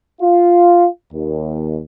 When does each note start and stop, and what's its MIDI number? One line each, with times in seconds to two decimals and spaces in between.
0.21 0.88 65
1.13 1.79 39